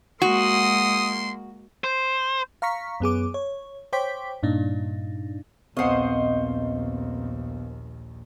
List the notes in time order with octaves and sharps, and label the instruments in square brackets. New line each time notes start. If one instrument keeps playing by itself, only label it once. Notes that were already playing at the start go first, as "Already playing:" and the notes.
[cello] G#3 A#3 [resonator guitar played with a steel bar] F#4 [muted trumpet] C6 [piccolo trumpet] D#6
[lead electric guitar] C5
[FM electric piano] F5 A#5 C#6 B6
F#2 B3 G#4 D6
C#5
C5 C#5 G5 D6 B6
G2 A#2 D4 D#4
[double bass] A#1 D#2 [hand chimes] B3 [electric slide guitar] C4 G#4 F#5 [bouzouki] C5 D#5